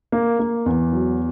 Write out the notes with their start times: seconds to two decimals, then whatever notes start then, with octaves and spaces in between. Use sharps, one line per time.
0.12 A#3
0.39 A#3
0.66 E2
0.93 F#3